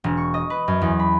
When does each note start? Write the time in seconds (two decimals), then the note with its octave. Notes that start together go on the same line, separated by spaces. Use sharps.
0.04 E1
0.17 C#6
0.34 D#5
0.50 B4
0.68 F#2
0.81 E2
0.99 B5